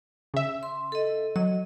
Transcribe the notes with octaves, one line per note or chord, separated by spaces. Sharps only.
C#3 E5
C6
A4 D#5
F#3 D#5